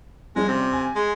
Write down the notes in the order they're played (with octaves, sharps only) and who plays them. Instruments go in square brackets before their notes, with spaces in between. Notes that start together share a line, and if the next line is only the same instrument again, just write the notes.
[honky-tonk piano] F3 G3 C#4 [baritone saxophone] G#3
[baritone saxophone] C3
[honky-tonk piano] G#5
[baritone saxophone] G#3